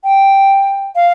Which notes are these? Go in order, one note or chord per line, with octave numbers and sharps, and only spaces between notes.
G5
F5